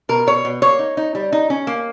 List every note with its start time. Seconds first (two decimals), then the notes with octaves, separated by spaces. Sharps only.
0.09 B2 A#4
0.27 B2 C#5
0.45 B2
0.62 A#3 C#5
0.79 D#4
0.97 D#4
1.15 G3
1.32 D#4
1.50 C#4
1.67 A#3